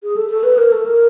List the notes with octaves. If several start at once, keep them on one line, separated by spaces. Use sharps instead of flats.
G#4
A4
A4
B4
A#4
A4
A#4